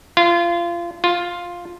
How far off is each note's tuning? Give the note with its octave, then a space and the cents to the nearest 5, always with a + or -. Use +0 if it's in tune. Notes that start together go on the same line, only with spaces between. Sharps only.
F4 -25
F4 +5